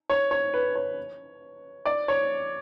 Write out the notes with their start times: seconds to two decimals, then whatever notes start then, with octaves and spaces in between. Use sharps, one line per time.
0.10 C#5
0.31 C#5
0.54 B4
0.75 C#5
1.85 D5
2.08 C#5